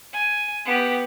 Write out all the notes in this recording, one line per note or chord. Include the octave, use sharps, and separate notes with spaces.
G#5
B3 G4